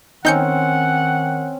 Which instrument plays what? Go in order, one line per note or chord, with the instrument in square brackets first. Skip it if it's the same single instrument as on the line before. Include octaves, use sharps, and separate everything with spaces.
[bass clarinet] D#3 [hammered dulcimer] C4 C#4 [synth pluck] D#4 G6 C#7 [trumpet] F#5